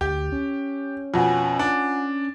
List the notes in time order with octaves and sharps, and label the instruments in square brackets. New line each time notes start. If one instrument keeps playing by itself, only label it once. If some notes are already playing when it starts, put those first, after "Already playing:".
[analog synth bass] D2 [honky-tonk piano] G4
[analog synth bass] C#4
[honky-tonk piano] F2 B2 [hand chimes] F4 F#5 G#5
[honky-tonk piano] D4